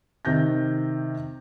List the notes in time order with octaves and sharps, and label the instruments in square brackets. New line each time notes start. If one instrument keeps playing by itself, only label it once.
[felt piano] C3 D#3 G6 A#6